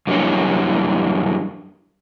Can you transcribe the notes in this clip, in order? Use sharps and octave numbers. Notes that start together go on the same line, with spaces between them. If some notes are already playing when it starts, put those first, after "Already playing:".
F#2 E3 G3 A#3 D4 C#5